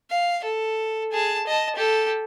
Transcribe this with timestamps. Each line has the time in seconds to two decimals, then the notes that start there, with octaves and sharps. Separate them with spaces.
0.10 F5
0.44 A4
1.12 G#4 A5
1.47 D#5 A5
1.76 G4 A4